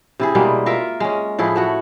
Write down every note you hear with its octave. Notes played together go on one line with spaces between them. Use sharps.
C3 E4 G#4
B2 G3 G#3 A#3
F4 A#4 E5
G#3 C#4
A2 F3 E4 G#4
A3 F#4 F#5